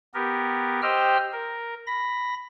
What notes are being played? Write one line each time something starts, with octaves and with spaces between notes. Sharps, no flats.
B3 G4 A#4
G4 C5 D#5 G5 E6 F6
A#4
B5 A#6